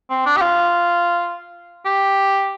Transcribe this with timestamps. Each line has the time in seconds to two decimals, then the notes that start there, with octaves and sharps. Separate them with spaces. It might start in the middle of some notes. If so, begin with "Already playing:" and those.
0.10 C4
0.26 D4
0.37 G4
0.41 F4
1.86 G4